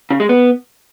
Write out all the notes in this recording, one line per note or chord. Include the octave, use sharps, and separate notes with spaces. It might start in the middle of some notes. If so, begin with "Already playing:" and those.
C#3
G#3
B3